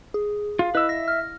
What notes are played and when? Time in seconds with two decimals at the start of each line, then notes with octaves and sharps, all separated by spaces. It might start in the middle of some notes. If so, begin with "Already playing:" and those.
0.14 G#4
0.59 F4 F5
0.75 E4 B4 D#5 E6
0.89 E5 A#6
1.08 F6